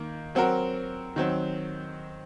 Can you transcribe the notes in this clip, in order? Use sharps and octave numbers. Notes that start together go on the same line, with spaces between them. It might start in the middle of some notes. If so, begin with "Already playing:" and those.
Already playing: D#3 A#3
F#3 C4 F#4 A#4
D#3 F#3 C4